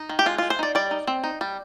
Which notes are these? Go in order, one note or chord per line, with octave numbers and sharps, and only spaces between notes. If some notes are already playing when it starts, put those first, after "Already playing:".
Already playing: D#4
D#3
G4
G#3 F4
G#3 F4
C5
D#4 D5
G3 D5
D#4
C4
D#4
G3